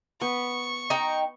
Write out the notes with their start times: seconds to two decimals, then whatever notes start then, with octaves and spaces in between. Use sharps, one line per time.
0.21 B3 C#6
0.90 D#4 G5 A#5